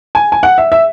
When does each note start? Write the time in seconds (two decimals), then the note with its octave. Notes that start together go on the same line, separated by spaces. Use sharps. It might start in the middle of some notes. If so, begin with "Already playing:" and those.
0.15 G#5
0.32 G#5
0.43 F#5
0.58 E5
0.72 E5